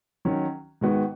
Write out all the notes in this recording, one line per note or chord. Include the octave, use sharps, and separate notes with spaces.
D#3 F#3 C#4
G#2 D#3 G#3 B3 F#4